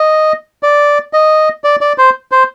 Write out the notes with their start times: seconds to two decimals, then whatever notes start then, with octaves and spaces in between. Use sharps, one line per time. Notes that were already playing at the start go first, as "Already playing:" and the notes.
Already playing: D#5
0.63 D5
1.13 D#5
1.64 D5
1.81 D5
1.98 C5
2.32 C5